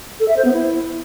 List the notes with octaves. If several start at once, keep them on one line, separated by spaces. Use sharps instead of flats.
A4
E5
C5
B3
E4